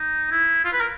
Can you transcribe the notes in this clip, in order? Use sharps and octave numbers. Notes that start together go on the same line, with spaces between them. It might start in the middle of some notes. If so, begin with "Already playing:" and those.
Already playing: D#4
E4
F4
B4
A#4